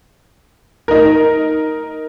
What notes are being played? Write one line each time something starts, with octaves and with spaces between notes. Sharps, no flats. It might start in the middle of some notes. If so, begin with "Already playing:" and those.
D#4 A#4